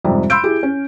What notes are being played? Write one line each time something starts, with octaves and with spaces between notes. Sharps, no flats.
F2 G#2 C3 G3
B5 C6 E6 G6 D7
E4 G4 G#4
C#4